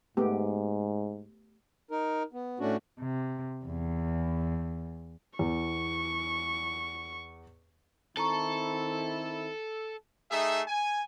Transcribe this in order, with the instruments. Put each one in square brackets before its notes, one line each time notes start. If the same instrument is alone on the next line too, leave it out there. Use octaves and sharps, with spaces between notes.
[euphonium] G#2 [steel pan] A3 B3 G4
[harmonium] D#4 A#4
B3
A2 A3 C#4 D4 F#4
[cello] C3
E2
[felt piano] E2 [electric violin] C#6
[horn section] D#3 C4 E4 [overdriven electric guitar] A4 [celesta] A5 A#5 C#6
[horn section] A3 D#4 G#4 E5
G#5